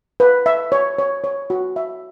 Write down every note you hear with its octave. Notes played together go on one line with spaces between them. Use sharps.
B4
E5
C#5
C#5
C#5
F#4
E5